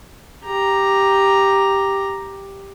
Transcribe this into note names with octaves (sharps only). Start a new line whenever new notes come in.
G4 A#5